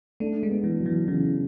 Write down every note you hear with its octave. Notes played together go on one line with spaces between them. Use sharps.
A3 D4
G#3
B3
E3
F#3
E3
C#3 E3